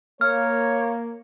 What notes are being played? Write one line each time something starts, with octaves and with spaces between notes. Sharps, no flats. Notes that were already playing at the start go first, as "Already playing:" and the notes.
A#3 C#5 F6